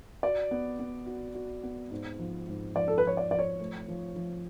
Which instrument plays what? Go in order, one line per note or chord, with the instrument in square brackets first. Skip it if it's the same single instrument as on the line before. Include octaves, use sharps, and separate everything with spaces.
[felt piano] F#4 [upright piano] D5
[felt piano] B3
B3
F#4
F#4
B3
G#2
F3
G#2
[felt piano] F3 [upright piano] D5
[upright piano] A4
B4
[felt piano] F3 [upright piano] C#5
[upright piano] D5
[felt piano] F3 [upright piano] D5
[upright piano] C#5
[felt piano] A3
F3
F3